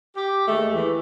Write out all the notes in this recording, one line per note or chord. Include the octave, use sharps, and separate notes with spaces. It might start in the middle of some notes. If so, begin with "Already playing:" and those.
G4
D#2 G#3 A3
E3